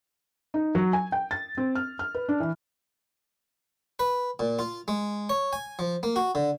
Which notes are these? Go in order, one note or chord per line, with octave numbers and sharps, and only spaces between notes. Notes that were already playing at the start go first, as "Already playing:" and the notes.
D#4
F#3
G#5
G5
A6
C4
F6
F6
B4
D4
E3
B4
A#2
F4
G#3
C#5
G#5
F3
A#3
F#4
D3